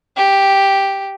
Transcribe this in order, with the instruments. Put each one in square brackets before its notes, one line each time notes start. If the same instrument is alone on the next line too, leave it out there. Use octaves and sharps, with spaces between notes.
[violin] G4